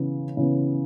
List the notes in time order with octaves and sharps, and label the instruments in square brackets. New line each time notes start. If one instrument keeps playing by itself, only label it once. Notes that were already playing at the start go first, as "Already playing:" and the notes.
Already playing: [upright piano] C#3 E3 B3
C#3 E3 B3